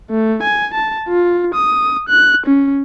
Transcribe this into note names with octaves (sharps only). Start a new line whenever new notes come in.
A3
G#5
A5
F4
D#6
F#6
C#4